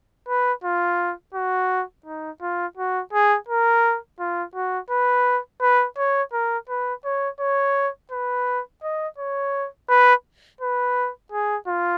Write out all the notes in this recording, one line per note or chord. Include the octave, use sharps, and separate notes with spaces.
B4
F4
F#4
D#4
F4
F#4
G#4
A#4
F4
F#4
B4
B4
C#5
A#4
B4
C#5
C#5
B4
D#5
C#5
B4
B4
G#4
F4